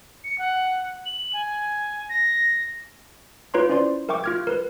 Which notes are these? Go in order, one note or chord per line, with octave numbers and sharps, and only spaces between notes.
C#7
F#5
F#7
G#5
A#6
F4 B4 C#5 A#5 C6
C#4 E4 C5 D5 C6
A#4 E5 G5 C#6 D6
F4 F6 G#6
A#4 B4